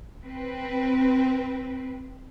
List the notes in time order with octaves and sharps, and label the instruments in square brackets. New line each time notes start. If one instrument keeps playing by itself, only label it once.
[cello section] C4 B4